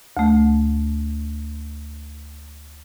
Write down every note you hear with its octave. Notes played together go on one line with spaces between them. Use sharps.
D2 A3